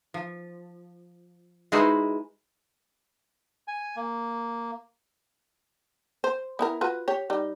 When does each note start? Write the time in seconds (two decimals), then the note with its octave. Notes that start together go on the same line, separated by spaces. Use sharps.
0.14 F3
1.72 G#3 D#4 E4 F#4 B4 C5
3.68 G#5
3.96 A#3
6.24 C5
6.59 B3 E4 A#4
6.81 F4 F#4 B4
7.08 G4 C#5
7.30 G3 D#4